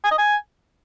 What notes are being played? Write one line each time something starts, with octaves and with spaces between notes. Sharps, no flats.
G#5
D#5
G#5